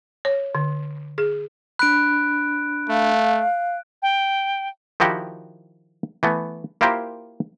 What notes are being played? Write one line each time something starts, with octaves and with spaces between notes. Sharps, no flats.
C#5
D3
G#4
D4 B5 F#6 D7
A3 F5
G5
D#3 F3 E4 F#4 G4
E3 A3 B3
A#3 E4 F4 G4 A#4 C5